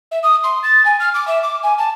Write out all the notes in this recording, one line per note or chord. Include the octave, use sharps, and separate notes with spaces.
E5
D#6
C6
A6
G#5
F6
D6
E5
D6
G#5
A5